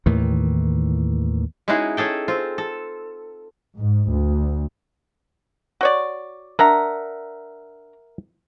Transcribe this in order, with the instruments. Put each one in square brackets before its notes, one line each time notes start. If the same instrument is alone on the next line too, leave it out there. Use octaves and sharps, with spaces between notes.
[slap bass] D#2 A2 D#3 E3
[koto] G#3 C#4 D#4 E4 F#4 G#4
C#4 G#4 A4 G5
C4 F4
A4
[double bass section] G#2
D2
[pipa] F#4 C#5 D5
[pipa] D4 A#5 [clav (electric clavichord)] A#4 E5 F#5